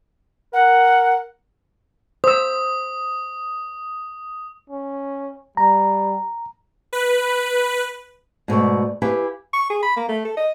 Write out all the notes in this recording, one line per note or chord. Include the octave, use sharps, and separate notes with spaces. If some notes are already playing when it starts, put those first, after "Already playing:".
A#4 F#5
C5 D#6 E6
C#4
G3 A#5
B4
G#2 B2 A3 D5
E4 G4 B4 F5 G#5
C#6
G#4
B5
A#3
A3
A4
D#5